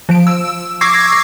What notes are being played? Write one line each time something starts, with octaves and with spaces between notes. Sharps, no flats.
F3 D7
E6
C#6 D6 E6 G#6 A#6 C7